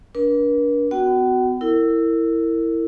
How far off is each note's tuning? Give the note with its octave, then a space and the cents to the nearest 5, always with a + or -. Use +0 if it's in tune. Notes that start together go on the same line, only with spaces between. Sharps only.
D4 -25 A#4 +45
B3 +35 F#4 +0 F#5 +45
E4 +0 A#4 -35